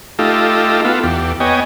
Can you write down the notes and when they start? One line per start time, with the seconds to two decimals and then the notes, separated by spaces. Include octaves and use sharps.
0.19 A3 D#4 F4 G4 A4
0.85 B3 F4 A4
1.03 E2 G4
1.40 B3 C#5 D#5 G5 G#5